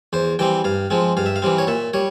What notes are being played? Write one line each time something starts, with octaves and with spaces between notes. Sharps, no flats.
E2 C5
E3 G3 C4 G5
G2 F5
F3 G#3 C4
G2 F5
E5
F5
E3 G3 C4
C#5
A#2 E5
G3 C#5